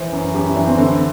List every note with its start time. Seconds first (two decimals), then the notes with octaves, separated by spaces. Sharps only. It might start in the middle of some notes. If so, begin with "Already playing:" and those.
Already playing: E3 C5
0.12 F#2
0.34 F#2 G4
0.46 E4
0.56 E3 D4
0.67 C4
0.77 D3 C4